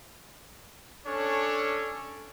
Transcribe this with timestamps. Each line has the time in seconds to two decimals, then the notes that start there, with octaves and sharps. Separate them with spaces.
1.06 C#4 D4 A4 C#5